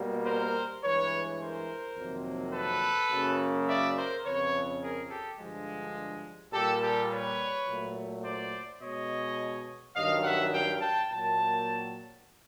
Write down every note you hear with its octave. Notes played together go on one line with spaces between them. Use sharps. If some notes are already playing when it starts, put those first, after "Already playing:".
Already playing: B2 G3 A#3
A#4 C5
G2 E3 G#3 B4 C#5
A#4 C5
F2 C3 D#3 F#3 A#3
A4 B4
F#2 C#3 F#3 A#3
D5 E5
A#4 C5
F2 C#3 F3 B4 C#5
G#4 A#4
G4 A4
G2 D3 F3 G#3
A#2 G3 A#3 G4 A4
G4 A4
B4 C#5
A#2 F#3 A3
C5 D5
B2 G#3 C#5 D#5
G2 D#3 F#3 D#5 F5
E5 F#5
F5 G5
G5 A5
A#2 F#3 A#3 G5 A5